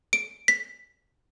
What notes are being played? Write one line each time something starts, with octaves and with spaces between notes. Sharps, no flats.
D7
B6